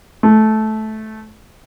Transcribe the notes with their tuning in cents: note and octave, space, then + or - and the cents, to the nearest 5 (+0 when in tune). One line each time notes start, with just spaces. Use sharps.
A3 -15